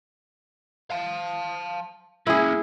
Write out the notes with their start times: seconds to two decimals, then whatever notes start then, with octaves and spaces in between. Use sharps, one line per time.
0.91 F5 A5
2.27 A#3 C#4 E4 G#4